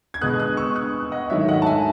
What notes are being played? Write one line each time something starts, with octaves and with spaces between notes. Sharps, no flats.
G#6
B2 G#3 B3 D#6 F#6
D#6 F#6
C#6 E6
D#6 F#6
D#5 F#5
G#2 D#3 F#3 A3 C#5 E5
E5
D#5 F#5
A5
E5 G#5